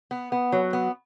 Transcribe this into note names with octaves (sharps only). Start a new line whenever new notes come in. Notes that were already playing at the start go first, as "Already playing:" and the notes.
B3
B3
F#3
B3